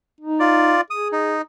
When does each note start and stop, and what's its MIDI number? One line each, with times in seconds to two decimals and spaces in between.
0.21 0.77 63
0.40 0.81 65
0.40 0.81 74
0.90 1.36 68
0.90 1.08 87
1.12 1.42 63